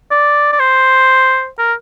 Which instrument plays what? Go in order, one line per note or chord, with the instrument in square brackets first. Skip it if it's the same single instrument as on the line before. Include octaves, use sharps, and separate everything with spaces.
[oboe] D5
D5
C5
A#4